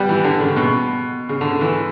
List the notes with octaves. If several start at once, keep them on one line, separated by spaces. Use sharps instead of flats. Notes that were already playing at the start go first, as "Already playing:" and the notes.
Already playing: G3 B3
E3
D3
C#3
B2
C#3
D3
E3